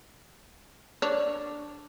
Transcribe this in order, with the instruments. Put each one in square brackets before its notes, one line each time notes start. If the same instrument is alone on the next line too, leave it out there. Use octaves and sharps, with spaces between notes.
[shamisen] D4 C#5